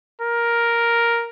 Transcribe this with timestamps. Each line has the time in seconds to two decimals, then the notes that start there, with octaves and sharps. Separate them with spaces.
0.21 A#4